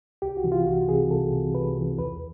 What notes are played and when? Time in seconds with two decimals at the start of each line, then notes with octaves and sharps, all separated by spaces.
0.22 C2 G4
0.37 F#4
0.44 C3 E3
0.52 F4
0.66 C2 F#4
0.88 C3 E3 G#4
1.10 C2 A4
1.32 C3 E3
1.55 C2 B4
1.76 C3 E3
1.99 E2 B4